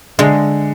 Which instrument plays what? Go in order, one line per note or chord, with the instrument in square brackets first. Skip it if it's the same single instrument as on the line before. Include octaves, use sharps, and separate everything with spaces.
[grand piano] D3 [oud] G#3